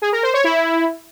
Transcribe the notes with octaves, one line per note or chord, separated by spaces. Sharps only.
G#4
A#4
C5
C#5
E4